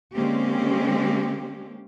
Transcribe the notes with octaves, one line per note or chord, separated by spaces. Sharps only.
D3 G#3 A#3 C4 C#4 G4